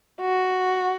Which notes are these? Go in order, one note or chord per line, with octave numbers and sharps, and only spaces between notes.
F#4